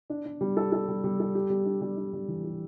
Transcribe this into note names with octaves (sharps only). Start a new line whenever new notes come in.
D4
D4
G3
A4
A4
G3
G3
A4
G4
G3
D4
G3
D4
G3
E3
G4